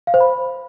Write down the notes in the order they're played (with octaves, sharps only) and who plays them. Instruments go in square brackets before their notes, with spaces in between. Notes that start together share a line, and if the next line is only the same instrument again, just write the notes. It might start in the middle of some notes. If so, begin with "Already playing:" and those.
[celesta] F5
C5
B5